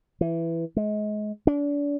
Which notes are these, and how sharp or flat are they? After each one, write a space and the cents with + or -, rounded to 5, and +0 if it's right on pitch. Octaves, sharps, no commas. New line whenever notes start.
E3 +10
G#3 +30
D4 -35